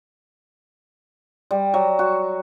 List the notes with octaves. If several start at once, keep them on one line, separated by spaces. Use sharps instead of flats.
G3
F#3
F#4